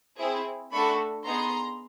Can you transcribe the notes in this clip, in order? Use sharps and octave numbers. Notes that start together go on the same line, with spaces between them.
C4 E4 G#4
A3 D4 F#4 A4 B5 C#6
B3 D#4 G#4 A#5 C6